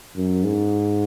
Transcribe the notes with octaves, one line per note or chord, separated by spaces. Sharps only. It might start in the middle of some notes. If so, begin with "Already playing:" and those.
F#2
G#2